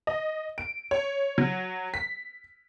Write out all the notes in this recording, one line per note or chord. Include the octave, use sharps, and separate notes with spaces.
D#5
D7
C#5
F#3
B6